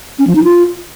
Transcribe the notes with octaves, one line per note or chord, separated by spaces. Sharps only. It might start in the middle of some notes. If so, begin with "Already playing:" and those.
C#4
F3
D#4
F4